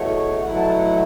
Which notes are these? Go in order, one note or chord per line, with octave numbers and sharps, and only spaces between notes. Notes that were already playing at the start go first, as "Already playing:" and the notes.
Already playing: E2 B2 A3 C#5
B2 F#3 A3 E4 F#5
A5
F#5
F#5